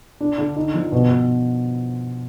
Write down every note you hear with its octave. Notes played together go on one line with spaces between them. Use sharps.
D4
D3
D#4
F3
B2
B2